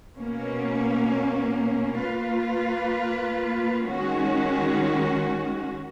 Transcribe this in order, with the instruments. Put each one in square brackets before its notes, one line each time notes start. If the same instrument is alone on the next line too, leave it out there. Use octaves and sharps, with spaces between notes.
[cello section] B2 A#3 C#4
A#3 F4 B4
D#3 G#3 C#4 F#4